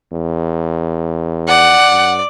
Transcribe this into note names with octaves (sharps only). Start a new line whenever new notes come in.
E2
D5 F#5
F#2